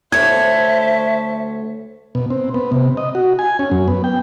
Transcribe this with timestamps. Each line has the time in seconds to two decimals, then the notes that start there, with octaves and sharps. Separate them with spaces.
0.12 D2 C5 C#5 E5 A5 G#6
2.15 B2
2.30 C4
2.54 B3
2.72 C3
2.97 D#5
3.15 F#4
3.39 G#5
3.59 C#4
3.71 F#2
3.88 B3
4.04 G5